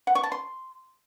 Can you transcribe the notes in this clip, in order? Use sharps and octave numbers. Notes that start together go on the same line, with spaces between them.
F#5
C#6
A5
C6